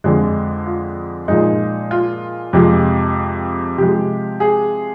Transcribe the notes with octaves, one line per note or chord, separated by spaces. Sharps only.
F2 D3 F3 G#3
F4
A#2 F3 G#3 D#4
F4
F2 C3 F3 G#3
C3 F3 G#3 G4
G#4